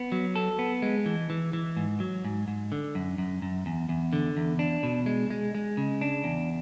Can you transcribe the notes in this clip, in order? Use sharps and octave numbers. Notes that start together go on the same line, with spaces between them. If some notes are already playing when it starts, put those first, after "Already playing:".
Already playing: B3
F#3
A4
B3
G#3
E3
E3
E3
G#2
F#3
G#2
G#2
D3
F#2
F#2
F#2
E2
E2
D3
E2
D4
B2
G#3
G#3
G#3
C#3
D4
E2